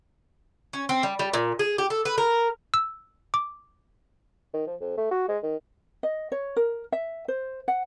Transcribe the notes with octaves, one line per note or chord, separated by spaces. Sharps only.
C#4
C4
G3
G3
A#2
G#4
G4
A4
B4
A#4
E6
D6
D#3
F3
F2
A3
F#4
G#3
D#3
D#5
C#5
A#4
E5
C5
F#5